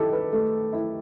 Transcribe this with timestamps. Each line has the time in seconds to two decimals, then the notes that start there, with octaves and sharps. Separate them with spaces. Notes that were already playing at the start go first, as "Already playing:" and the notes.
Already playing: D#3 E4 G4 A4
0.13 B4
0.32 A3
0.73 E4